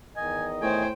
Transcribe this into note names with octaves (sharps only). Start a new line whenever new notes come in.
E2 D#3 D#5 G#5
A2 C5 G5 G#5